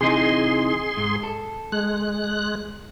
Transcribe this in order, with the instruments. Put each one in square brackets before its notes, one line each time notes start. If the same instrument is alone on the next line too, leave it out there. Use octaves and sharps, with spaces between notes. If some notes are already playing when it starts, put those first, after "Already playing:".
[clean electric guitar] C3 E3 D#4 [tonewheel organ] G#4 C6
[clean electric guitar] G#2
A4
[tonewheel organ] G#3 F#6